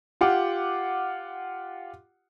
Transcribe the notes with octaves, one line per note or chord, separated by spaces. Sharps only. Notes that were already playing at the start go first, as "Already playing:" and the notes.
F4 G4 F#5 D6